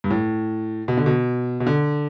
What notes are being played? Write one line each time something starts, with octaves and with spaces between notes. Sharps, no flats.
G2
A2
B2
D3
B2
B2
D3